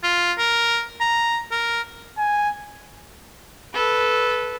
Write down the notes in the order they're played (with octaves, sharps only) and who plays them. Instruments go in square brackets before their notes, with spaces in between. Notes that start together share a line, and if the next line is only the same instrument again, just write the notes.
[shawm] F4
A#4
A#5
A#4
[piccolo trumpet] G#5
[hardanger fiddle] A4 B4